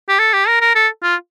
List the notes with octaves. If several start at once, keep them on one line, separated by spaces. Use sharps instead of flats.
G4
A4
G4
A#4
A#4
A4
F4